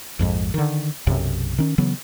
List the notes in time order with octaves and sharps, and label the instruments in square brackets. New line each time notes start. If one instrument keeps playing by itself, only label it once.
[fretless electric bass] A#1 F2 G#2
D3 D#3
B1 F#2 C3
D#3 C#4
C#3 E3 F#3 B3